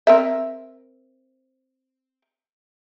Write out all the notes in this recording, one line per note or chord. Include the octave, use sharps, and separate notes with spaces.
C4 A#4 E5